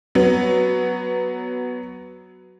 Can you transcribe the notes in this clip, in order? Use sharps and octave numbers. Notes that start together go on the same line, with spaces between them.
F#3 B3